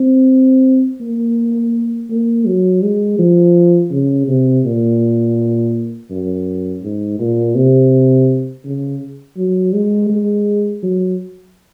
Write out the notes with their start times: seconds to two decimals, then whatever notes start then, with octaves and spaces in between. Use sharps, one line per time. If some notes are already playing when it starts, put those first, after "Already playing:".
Already playing: C4
1.01 A#3
2.10 A#3
2.46 F#3
2.82 G#3
3.19 F3
3.91 C#3
4.27 C3
4.65 A#2
6.10 F#2
6.82 G#2
7.19 A#2
7.55 C3
8.65 C#3
9.37 F#3
9.73 G#3
10.10 G#3
10.83 F#3